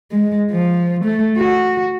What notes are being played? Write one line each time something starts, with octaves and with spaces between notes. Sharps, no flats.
G#3
F3
A3
F#4